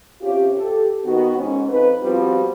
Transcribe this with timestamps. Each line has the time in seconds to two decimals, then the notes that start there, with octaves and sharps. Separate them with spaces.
0.22 C3 C#4 F4 G4
0.56 G4 A4
1.04 D#3 B3 F#4
1.37 G#2 C#4
1.69 F2 C4 D#4 B4
2.02 F3 G3 B3 C4 F4 F#4